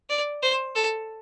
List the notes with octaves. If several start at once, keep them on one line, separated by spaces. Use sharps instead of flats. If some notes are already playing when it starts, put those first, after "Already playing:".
D5
C5
A4